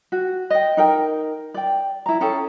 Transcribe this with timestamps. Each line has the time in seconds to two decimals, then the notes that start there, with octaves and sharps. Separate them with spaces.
0.12 F#4
0.50 D#5 G5
0.77 D#4 A#4 G5
1.54 D5 G5
2.06 E4 A#5
2.21 C#4 G#4 A4 G5